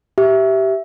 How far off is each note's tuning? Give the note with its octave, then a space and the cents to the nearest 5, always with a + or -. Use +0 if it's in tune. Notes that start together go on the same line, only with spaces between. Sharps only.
G4 -20 E5 +0